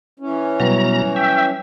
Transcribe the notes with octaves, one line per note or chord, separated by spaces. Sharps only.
E3 C#4
B2 F#3 G3 B4 A#5
E5 G5